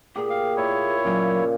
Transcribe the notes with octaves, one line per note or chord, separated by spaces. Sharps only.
A#2 G4 G#4
F5
A#2 E4 C#5
A#2 C#3 F#3